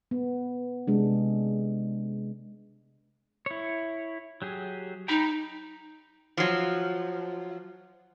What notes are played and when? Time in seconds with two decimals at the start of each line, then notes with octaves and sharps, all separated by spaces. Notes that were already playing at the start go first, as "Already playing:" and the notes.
0.11 B3
0.87 C3 G#3 D4
3.46 E4 C#5
4.42 F#3 G4 G#4
5.08 D#4 G5 A#5 B5
6.37 F3 F#3